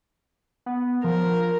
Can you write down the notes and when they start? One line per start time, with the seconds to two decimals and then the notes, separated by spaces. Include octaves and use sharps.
0.66 B3
1.04 F3 A#4